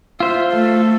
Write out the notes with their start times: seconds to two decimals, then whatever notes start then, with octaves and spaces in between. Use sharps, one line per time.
0.20 F4 C5 E5
0.52 A3 A4